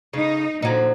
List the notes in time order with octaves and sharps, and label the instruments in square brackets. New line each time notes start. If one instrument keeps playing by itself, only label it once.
[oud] C#3 [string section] D#4
[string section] A#2 D3 [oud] F3 F#3 D#4